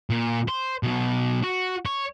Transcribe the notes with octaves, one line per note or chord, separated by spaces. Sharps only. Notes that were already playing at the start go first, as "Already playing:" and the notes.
A#2
C5
B2 F#3
F#4
C#5